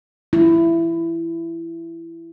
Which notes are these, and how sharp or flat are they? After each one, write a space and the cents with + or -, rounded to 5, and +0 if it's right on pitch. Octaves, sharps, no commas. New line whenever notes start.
E4 +15